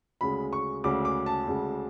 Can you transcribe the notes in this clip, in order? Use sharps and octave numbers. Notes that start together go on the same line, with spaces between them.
D2 C#3 G#3 B5
C#6
D2 C#3 G#3 D6
D6
A5
D2 C#3 G#3